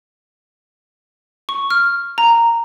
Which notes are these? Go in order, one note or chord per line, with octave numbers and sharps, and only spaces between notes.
C#6
F6
A#5